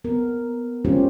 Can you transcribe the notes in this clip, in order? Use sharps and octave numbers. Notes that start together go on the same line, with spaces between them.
B3 A#4
G#3 C#4 F4 G4 C5